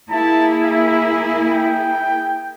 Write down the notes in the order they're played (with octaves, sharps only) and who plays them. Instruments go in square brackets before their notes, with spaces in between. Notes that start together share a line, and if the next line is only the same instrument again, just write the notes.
[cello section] A#3 E4 G#4 [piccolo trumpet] A5
[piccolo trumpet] E5
G5